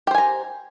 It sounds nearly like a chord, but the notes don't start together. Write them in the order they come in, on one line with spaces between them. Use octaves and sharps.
G4 C5 G#5 A#5